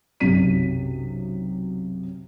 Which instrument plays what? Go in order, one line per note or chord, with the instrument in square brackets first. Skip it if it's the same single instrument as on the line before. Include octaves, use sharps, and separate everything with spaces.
[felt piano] B1 F#2 C3 F#3 B6 D#7